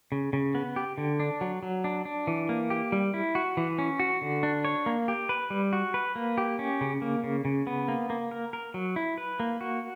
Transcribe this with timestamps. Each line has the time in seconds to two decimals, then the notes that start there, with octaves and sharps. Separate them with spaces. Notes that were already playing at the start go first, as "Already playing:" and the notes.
0.12 C#3
0.33 C#3
0.55 B3
0.76 G4
0.98 D3
1.20 D4
1.41 F#3
1.63 F#3
1.84 D4
2.05 D4
2.27 E3
2.49 A#3
2.70 G4
2.92 G3
3.14 E4
3.35 F#4
3.57 E3
3.78 C#4
4.00 F#4
4.22 D3
4.43 D4
4.65 C#5
4.86 A#3
5.08 G4
5.29 B4
5.50 G3
5.73 F#4
5.94 B4
6.16 A#3
6.38 G4
6.59 C#4
6.81 C#3
7.02 A#3
7.24 C#3
7.45 C#3
7.67 B3
7.88 A#3
8.10 A#3
8.31 A#4
8.53 A#4
8.74 F#3
8.96 E4
9.18 B4
9.40 A#3
9.61 F#4